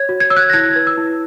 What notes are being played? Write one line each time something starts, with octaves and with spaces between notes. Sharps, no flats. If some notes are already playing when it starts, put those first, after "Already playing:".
Already playing: C#5 G#6
F#4
G#6
C#5 E6
F#6
A#6
E4 G#6
B4
E6
E4